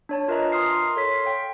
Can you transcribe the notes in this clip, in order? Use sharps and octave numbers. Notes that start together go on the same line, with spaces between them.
D4 C#5 A5
F4 A#4 B4 D#5 E5 A#5
G#5 A#5 C6 D#6 F6 C7
C6
A4 C#5 C6 B6
F5 G5